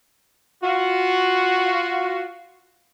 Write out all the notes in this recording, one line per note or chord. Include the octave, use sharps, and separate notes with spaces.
F4 F#4